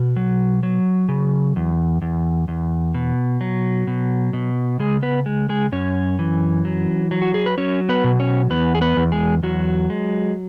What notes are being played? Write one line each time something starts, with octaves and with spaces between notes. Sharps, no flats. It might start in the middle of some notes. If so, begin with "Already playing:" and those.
Already playing: B2 F#4
F#3
F#3
C#3
E2
E2
E2
B2
F#3
B2
B2
C#3 G#3 G#4
B3 B4
G#3
G#3 G#4
F#2 C#4 C#5
E3
F#3
F#3
F#4
G#4
B4
F#3 C#4 C#5
B3 B4
B2
C#4 C#5
E2 B3 B4
G#4
B3 B4
E2
G#3 G#4
E2 F#3 F#4
G#3